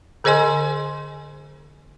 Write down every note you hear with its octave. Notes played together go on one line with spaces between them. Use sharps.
D3 G#4 C5 D#5 G#5 C6